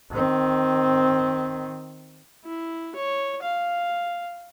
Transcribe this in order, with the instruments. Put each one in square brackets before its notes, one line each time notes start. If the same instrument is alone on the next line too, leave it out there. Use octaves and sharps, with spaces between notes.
[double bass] D#3 C4
[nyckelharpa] E4
C#5
F5